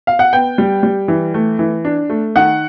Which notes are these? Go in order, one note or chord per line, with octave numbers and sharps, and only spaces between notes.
F5
F#5
B3 G5
G3
G3
E3
A3
E3
D4
A3
D#3 F#5